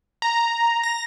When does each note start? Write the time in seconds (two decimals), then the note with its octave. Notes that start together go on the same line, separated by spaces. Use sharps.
0.22 A#5
0.83 A#6